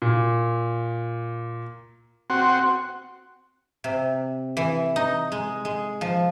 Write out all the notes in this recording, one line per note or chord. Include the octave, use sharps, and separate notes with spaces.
A#2
C4 F#4
C3
E3
D#4
G#3
G#3
F3